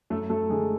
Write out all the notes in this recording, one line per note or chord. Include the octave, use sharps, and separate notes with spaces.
F#2 A3 A4
A3 A4
D3 G#3 G#4